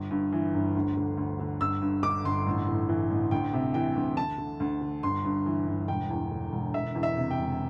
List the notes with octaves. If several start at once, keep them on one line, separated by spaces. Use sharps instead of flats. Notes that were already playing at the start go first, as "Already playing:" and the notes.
Already playing: G1
G2
E3
G1
D2
D3
D2
D3
G1 E6
G2
D3 D6
G1 C6
A1
A2
E3
A1
D2 G5
C3
E3 G5
D2
D2 A5
D3
D2
D3
G1 C6
G2
E3
G1
E1 G5
E2
D3
E1
E1 E5
E2
E5
C3
G5
E1